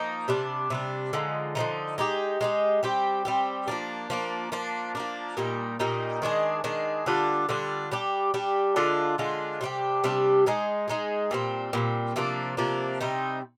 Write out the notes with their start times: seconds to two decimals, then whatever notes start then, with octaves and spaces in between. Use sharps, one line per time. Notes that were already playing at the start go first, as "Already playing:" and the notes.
Already playing: F3 A#3 D#4
0.28 C3 G3 D4
0.70 C3 G3 D4
1.13 D3 F3 G#3 D#4
1.55 D3 F3 G#3 D#4
1.98 G#3 D#4 G4
2.41 G#3 D#4 G4
2.83 G3 C4 G4
3.25 G3 C4 G4
3.68 F3 A#3 D4
4.10 F3 A#3 D4
4.52 F3 A#3 D4
4.95 F3 A#3 D4
5.37 A#2 G3 A#3 D#4
5.79 A#2 G3 A#3 D#4
6.22 D#3 G#3 D4 G#4
6.64 D#3 G#3 D4 G#4
7.06 D3 G3 D4 F4
7.49 D3 G3 D4 F4
7.91 G3 D4 G4
8.34 G3 D4 G4
8.76 D3 G#3 D4 F4
9.18 D3 G#3 D4 F4
9.61 C3 G3 D4 G4
10.04 C3 G3 D4 G4
10.46 G#3 D#4 G#4
10.88 G#3 D#4 G#4
11.31 A#2 G3 C4
11.73 A#2 G3 C4
12.16 C3 F3 A#3 D4
12.57 C3 F3 A#3 D4
13.01 C3 G3 C4 D#4